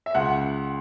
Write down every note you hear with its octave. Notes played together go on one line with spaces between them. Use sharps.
E5
C#2 F#5